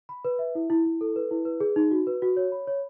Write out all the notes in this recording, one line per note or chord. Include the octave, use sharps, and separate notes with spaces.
B5
B4
E5
E4
E4
E4
A4
B4
E4
B4
G#4
D#4
F#4
B4
F#4
C#5
B5
C#5